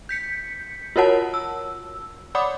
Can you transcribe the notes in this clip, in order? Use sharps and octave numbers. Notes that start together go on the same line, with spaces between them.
G6 B6 C#7
F4 F#4 A#4 C#5 F#5 A5
E6
C#5 D5 F#5 B5 D6 D#6